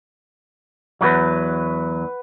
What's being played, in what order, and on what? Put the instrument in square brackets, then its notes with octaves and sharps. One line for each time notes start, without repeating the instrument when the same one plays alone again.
[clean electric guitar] E2 G2 F#3 [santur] B4 F#5